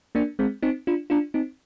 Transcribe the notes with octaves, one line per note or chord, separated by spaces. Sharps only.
A#3 D4
G#3 C4
C4 D#4
D4 F4
D4 F4
C4 D#4